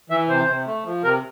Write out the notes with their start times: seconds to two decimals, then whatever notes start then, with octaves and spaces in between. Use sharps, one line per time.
0.10 E3 E5
0.28 C3 C5
0.47 C3
0.66 A3
0.85 F3
1.03 C3 A#4